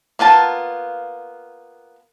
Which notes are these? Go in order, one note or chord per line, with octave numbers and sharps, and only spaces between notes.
A#3 B3 F4 A5